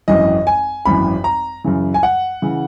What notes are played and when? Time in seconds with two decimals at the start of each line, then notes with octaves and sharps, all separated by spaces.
0.08 G#1 F#2 E3 D#5
0.47 G#5
0.85 G#1 F#2 E3 B5
1.24 A#5
1.64 F#2 C#3 E3
1.94 G#5
2.03 F#5
2.42 C#3 E3